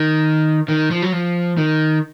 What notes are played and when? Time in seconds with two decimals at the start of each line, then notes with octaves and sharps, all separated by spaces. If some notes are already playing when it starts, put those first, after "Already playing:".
Already playing: D#3
0.68 D#3
0.91 F3
1.02 F#3
1.13 F3
1.57 D#3